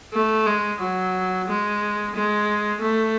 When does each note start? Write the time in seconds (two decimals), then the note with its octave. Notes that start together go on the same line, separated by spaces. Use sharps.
0.13 A3
0.46 G#3
0.81 F#3
1.48 G#3
2.15 G#3
2.82 A3